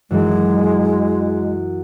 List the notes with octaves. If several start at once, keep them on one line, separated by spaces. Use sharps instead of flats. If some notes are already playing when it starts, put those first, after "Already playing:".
F#2 E3 G#3